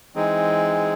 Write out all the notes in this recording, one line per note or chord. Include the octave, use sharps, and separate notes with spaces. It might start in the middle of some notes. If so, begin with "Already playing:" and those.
E3 G#3 C4 D#4 G#4